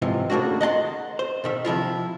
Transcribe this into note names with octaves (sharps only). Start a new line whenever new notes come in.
G#2 C3 E3 F3
C#3 A3 A#3 D4 F#4
D#5 F#5 A5 C6
C5
B2 D#3 E5
C3 F3 E4 F4